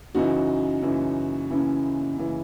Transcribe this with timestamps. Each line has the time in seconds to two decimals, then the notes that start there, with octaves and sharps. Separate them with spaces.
0.15 F#2 C#3 E3 D#4 F#4
0.82 F#2 C#3 E3
1.50 F#2 C#3 E3 C#4 E4
2.17 F#2 C#3 E3